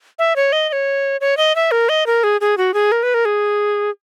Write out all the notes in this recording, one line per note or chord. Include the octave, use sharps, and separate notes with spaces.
E5
C#5
D#5
D#5
C#5
C#5
D#5
E5
A#4
D#5
A#4
G#4
G#4
F#4
G#4
A#4
B4
A#4
G#4